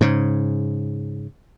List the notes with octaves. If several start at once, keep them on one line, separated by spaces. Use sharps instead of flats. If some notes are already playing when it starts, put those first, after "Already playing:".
G#2 C#3